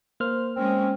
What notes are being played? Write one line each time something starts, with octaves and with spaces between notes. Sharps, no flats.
A#3 C5 F6
G#3 C4 C#4